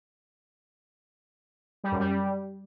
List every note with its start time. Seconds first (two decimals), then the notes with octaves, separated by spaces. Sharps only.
1.84 G3
1.92 F#2
2.00 G3